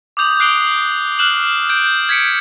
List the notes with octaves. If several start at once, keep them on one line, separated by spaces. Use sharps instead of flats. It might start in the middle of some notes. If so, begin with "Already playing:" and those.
D6 D#6 G6 F7
F#6 C7 D7 G7
F6 F#6 E7 F#7
G6 D7
G#6 B6 C#7 D7